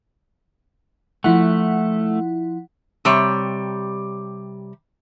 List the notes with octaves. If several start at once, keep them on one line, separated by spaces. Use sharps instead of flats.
F3 A3 E4 F#5
C3 G3 C#5